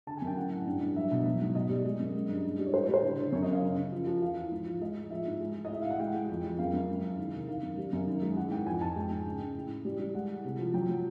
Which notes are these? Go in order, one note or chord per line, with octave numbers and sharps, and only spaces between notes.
D3 A5
G#5
F#2
G5
A2 F#5
A2
G2
G2
F#3 E5
B2
F#3
G#2
B2 D#5
G3
G#3
F#2
G#3
G2
E3
G3
C#5
A2 C5
C#5
G3 C5
D3
D3
F#2 C#5
D#5
F#2 F5
C#3
C#3
F3
F3
E2 F5
E2
G#2
F3
G#3 D#5
A2
F3 E5
G#2
G#3
E3
D#5
A2 E5
A2 F5
F#5
G#3 G5
G#3
F2
F2
F#2 F5
F#2
G#3
E2
D#3
C3
D#3 F5
F#2
G3
F#2
D#3
G#3
E3 F#5
G#2 G5
F2 G#5
F2 A5
G#3 G5
G#2
C#3
C#3
A2
A2
G3
G3
G#3 F#5
E3
C3
F3
F#3 G5
F#3